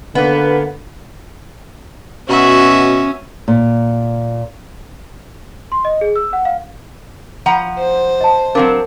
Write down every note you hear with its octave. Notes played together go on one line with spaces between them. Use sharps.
D3 A#3 B3 B4
B2 C#4 F#4 E5
A#2
C6
D#5
G#4
E6
F#5
F5
F3 F#5 A#5
C5
D#5 A5
F#3 C4 D4 A#4 F5